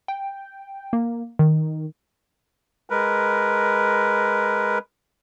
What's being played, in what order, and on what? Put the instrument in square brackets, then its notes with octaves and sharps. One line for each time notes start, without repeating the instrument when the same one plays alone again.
[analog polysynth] G5
A#3
D#3
[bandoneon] G#3 A#4 B4